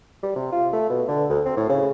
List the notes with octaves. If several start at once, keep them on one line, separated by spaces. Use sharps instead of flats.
G3
C3
F4
A3
B2
D3
D2
C4
A2
C#3